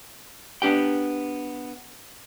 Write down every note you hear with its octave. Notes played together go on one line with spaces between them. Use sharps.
B3 D4 G4 G5